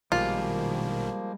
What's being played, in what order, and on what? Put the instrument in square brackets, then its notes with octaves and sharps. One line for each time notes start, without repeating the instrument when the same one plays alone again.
[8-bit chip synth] A#1 B2 D#3 [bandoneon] F3 A#3 [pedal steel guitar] G3 G#3 [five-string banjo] F4